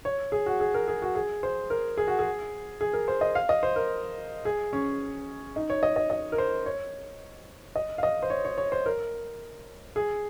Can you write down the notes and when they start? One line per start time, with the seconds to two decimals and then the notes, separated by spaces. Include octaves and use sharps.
0.05 C#5
0.32 G#4
0.46 F#4
0.60 G#4
0.74 A#4
0.88 G#4
1.02 F#4
1.15 G#4
1.43 C5
1.70 A#4
1.97 G#4
2.07 F#4
2.19 G#4
2.81 G#4
2.93 A#4
3.08 C5
3.21 D#5
3.35 F5
3.49 D#5
3.63 C5
3.76 A#4
4.45 G#4
4.73 C#4
5.56 D#4
5.70 C#5
5.83 D#5
5.96 D#5
6.10 D#5
6.32 A#4
6.38 C5
6.66 C#5
7.76 D#5
7.98 F5
8.03 D#5
8.23 C5
8.30 C#5
8.45 C#5
8.58 C#5
8.72 C5
8.86 A#4
9.96 G#4